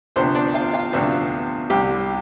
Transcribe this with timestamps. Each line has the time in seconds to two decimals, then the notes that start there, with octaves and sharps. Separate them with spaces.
0.16 D2 C3 F3 B3 D4 C5 C6
0.35 D4 D5
0.54 F4 F5
0.73 F4 F5
0.93 D2 C3 F3 B3 D4
1.70 C2 C3 G3 G4 G5